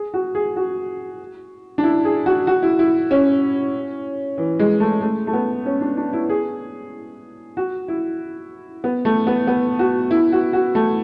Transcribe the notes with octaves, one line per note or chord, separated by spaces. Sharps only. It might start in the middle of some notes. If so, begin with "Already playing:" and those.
Already playing: G#4
F#4
G#4
F#4
D4
E4
G#4
F#4
F#4
E4
E4
C#4
E3
G#3
A3
A3
A3
B3
C#4
D4
D4
E4
G#4
F#4
E4
B3
A3
B3
B3
F#4
E4
F#4
F#4
A3